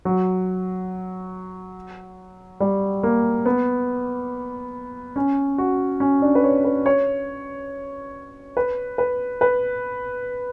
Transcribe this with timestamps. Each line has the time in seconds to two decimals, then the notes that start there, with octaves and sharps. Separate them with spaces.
0.05 F#3
2.60 G3
3.03 A#3
3.46 B3
5.16 C#4
5.58 F#4
6.00 C#4
6.22 D4
6.35 B4
6.44 C#5
6.64 B4
6.86 C#5
8.57 B4
8.98 B4
9.41 B4